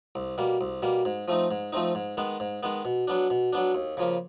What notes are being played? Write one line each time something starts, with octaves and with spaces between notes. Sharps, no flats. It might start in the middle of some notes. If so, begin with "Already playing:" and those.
C2
B2 G3 A#3
C2
B2 G3 A#3
G#2
F3 A3 C4 D#4
G#2
F3 A3 C4 D#4
G#2
D#3 G#3 B3
G#2
D#3 G#3 B3
B2
F#3 B3 D4
B2
F#3 B3 D4
D#2
C#3 F3 A#3